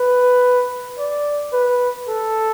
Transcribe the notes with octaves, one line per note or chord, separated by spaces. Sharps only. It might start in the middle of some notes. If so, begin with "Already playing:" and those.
Already playing: B4
D5
B4
A4